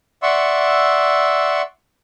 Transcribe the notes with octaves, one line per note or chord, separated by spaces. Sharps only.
D5 E5 F#5 C6 C#6 E6